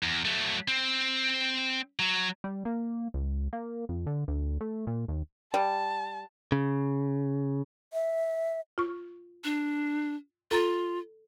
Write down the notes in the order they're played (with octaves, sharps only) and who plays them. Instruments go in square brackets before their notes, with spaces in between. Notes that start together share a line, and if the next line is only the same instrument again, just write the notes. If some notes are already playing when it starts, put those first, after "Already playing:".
[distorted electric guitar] E2
F#3 A3
C4
F#3
[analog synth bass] G3
A#3
C#2
A#3
F2
D3
D2
A3
A#2
D#2
[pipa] G3 [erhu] A5
[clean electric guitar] C#3
[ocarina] E5
[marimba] F4 C#6
[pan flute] D4
[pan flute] F4 [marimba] A4 A#5 A6